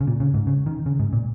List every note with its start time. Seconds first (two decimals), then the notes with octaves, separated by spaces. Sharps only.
0.01 C#3
0.07 A#2
0.20 C#3
0.34 G#2
0.47 C#3
0.66 D#3
0.86 C#3
0.99 G#2
1.13 A#2